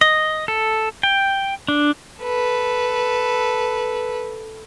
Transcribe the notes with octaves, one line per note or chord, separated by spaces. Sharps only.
D#5
A4
G5
D4
A4 B4